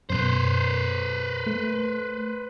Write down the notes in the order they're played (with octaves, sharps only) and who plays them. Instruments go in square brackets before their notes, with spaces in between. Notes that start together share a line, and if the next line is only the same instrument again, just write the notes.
[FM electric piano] F#2 B2 [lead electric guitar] B4 C5
[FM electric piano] A3